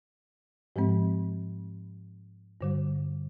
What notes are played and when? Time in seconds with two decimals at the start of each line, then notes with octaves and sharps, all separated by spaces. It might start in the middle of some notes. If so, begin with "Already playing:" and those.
0.76 G#2 F3 G#3 C4
2.61 G2 D3 G3